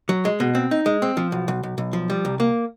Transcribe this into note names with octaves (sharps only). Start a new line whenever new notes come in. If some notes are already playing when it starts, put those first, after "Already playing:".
F#3
G#3
B2
C4
D#4
G#3
C4
F3
B1
B1
B1
B1
F3
G3
C2
A#3